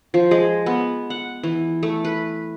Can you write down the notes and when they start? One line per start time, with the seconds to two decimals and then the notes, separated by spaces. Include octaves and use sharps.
0.14 F3
0.31 G#3
0.66 B3
1.10 F#5
1.43 E3
1.83 A3
2.04 B4